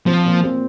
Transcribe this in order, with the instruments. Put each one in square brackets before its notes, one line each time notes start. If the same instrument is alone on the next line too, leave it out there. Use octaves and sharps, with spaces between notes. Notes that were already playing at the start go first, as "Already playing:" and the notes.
[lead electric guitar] F3 [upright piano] C4
[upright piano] A#2
C4